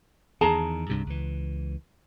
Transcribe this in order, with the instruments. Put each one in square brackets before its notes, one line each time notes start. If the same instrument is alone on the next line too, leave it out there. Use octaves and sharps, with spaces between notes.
[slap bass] E2 D#3 [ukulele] G#4 A5 A#5
[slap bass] C2 G2 C3
C#2 E3